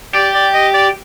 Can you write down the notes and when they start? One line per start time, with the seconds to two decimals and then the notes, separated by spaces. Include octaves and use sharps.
0.14 G4 D5
0.34 D5
0.54 D#5
0.74 D5